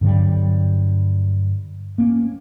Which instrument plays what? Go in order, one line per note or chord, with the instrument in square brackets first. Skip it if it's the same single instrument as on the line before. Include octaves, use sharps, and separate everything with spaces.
[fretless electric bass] G2 D3 F#3 G3
A#3 C#4